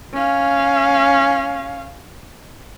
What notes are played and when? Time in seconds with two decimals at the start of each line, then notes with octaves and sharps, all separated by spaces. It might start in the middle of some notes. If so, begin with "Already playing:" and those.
0.13 C#4 F5